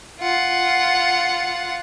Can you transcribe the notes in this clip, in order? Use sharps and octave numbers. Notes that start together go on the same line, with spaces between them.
F4 F#5